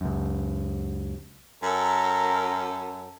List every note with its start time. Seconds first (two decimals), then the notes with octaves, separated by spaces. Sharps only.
0.01 C#2 F#2
1.63 F#2 A4 A#4